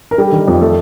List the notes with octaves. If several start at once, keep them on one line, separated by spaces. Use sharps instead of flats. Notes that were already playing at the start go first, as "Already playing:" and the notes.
A#4
G3 A4
D#3
F2
A3 A4